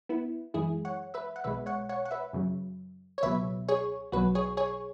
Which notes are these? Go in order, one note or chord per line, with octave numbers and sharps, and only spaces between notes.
B3 E4
F#2 E3 G#3 E4 G#4
C#5 F#5
B4 E5
F#5
B1 B2 G#3 B4 E5
C#5 F#5
C#5 F#5
F#5
B4 E5
F#2 C#3 F#3
C#5
C#2 B2 F#3 B4 E5
G#4 C#5
B1 B2 F#3 F#4 B4
G#4 C#5
G#4 C#5